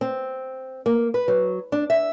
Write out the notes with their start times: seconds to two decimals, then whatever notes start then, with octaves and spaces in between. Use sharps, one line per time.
0.01 C4
0.86 A#3
1.14 B4
1.28 F#3
1.72 D4
1.90 E5